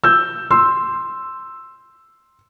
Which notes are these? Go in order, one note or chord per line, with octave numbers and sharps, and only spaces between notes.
E6 G6
C6 E6